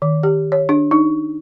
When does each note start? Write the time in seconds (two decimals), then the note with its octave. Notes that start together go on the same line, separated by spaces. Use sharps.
0.02 D#3
0.23 G4
0.52 C#5
0.69 D4
0.91 D#4